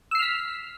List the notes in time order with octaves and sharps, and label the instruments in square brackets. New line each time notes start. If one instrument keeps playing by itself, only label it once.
[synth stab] E6
C7
F6
B6